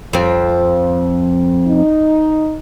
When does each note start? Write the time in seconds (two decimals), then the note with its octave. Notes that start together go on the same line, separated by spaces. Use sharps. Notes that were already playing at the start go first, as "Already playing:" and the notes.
0.13 F2 F3 C4
1.67 D#4